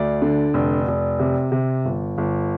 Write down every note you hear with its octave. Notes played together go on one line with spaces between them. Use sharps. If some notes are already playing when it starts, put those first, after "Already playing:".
Already playing: D2 D5
D3
F1
F1
C3
C3
G1
G1